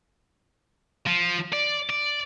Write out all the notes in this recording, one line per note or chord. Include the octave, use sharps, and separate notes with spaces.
F3
D5
D5